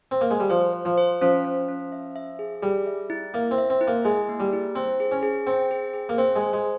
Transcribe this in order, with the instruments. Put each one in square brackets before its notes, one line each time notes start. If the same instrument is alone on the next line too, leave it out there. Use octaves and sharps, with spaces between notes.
[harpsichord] C4
A#3
G#3
G3
[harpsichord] F3 [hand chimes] C5
[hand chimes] C5
[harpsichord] F3
[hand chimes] C5
[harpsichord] F3 [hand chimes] C#4
[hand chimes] C#4
C#4
E5
E5
G#4
[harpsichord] G3 [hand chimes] G#4
[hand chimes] E5
E4
[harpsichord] A#3 [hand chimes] E5
[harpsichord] C4
[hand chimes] E5
[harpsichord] C4
[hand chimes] E4
[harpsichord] A#3
[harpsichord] G#3 [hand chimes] G#4
[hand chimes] A#3
[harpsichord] G3
[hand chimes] E4
[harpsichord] C4 [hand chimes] C5
[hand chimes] G#4
[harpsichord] C#4
[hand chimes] G#4
[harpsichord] C4 [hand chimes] G5
[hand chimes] G#4
G#4
[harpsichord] A#3
[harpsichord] C4 [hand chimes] C5
[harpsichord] G#3
[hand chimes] C5
[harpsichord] G#3